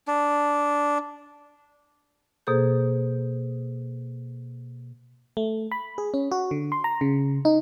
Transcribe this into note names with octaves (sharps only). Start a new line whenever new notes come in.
D4
B2 A#3 G#4 A4 C5 G6
A3
B5
G#4
C#4
F#4
D3
C6
A#5
C#3
D#4